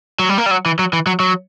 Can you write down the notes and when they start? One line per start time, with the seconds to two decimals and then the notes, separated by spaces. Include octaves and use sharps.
0.19 F#3
0.29 G3
0.38 A#3
0.46 G3
0.51 F#3
0.66 E3
0.79 F#3
0.93 E3
1.06 F#3
1.20 F#3